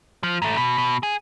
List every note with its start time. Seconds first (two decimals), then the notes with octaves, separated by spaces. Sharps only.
0.23 F3
0.42 G#2 A3
0.57 B2
0.78 B2
1.03 G#4